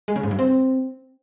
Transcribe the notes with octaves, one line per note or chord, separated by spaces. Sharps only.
G#3
C#3
G#2
G2
C4